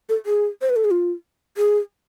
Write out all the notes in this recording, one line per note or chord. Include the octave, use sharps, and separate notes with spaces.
A4
G#4
C5
B4
A4
G#4
F4
G#4